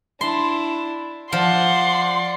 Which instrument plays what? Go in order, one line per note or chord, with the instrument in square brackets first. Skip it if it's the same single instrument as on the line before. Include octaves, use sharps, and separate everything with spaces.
[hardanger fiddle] D4 E4 [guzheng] C6
[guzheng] F3 [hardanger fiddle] D5 F#5 [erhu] C6